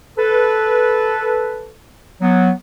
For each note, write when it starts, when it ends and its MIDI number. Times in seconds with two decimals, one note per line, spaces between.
0.17 1.73 69
0.17 1.73 71
2.21 2.51 54
2.21 2.51 59